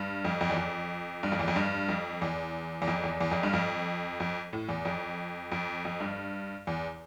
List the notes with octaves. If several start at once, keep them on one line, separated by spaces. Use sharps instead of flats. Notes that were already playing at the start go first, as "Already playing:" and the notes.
Already playing: G2
F2
F2
E2
F2
G2
F2
E2
F2
G2
F2
E2
E2
F2
E2
E2
F2
G2
F2
F2
A2
E2
F2
F2
F2
G2
E2